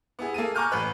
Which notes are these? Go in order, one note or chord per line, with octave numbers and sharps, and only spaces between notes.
B3 E4 G#4
A#3 G#4 A4 D#7
G#5 A#5 C#6 D6 F6 G6
A1 B4 F#6